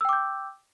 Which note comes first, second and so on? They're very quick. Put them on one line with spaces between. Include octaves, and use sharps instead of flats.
E6 G5 D6 G6